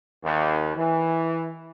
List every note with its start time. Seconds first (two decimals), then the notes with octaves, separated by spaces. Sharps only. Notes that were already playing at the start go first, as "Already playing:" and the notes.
0.24 D#2
0.76 E3